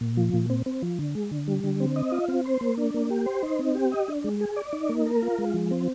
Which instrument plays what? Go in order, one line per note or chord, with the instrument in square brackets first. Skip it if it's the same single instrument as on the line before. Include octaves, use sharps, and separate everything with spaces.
[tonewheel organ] A#2
F3
A#2
C4
C4
F3
D3
G#3
D3
G3
D3
C4
D#5
F4
C4
C5
A#3
D4
A#3
G4
C5
D#4
C4
G4
D#5
D4
G#3
G#4
D5
D#4
A#3
A#4
F4
G#3
F3
C4